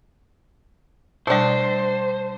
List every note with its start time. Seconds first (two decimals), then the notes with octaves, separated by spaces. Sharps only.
1.27 B2 G3 A3 D4 C5